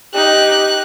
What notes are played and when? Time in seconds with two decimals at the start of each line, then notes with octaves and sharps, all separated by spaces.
0.14 D#4 G4 F#6